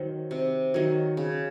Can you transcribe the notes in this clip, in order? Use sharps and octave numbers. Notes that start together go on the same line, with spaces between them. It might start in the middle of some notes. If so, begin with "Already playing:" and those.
Already playing: D#3 F#3 C5
C3
D#3 F#3
C#3